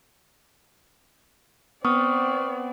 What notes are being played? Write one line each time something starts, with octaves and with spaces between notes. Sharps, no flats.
B3 C4 D5 C#6 D#6 F6